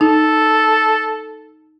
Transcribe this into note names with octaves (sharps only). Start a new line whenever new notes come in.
D#4 A4